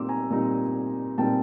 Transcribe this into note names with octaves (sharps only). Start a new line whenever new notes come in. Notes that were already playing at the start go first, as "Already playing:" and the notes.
Already playing: A#2 G3 C4 D#4 C6 D6 E6
G#5 A#5
A#2 G3 C4 D#4
A#2 G3 C4 D#4 G5 A5